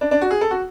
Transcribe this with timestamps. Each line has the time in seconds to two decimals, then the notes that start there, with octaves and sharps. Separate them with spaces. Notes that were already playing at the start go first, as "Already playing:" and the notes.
0.01 D4
0.11 D4
0.21 F#4
0.31 G#4
0.41 A4
0.51 F#4